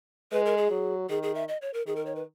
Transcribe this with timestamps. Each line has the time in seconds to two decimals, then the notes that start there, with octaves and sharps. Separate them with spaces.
0.32 G#3 B4
0.46 A#4
0.57 G#4
0.71 F#3
1.10 D#3 G#4
1.23 G#4
1.35 E5
1.48 D#5
1.62 C#5
1.74 A#4
1.87 D#3 G#4
1.96 A#4
2.06 C#5
2.16 B4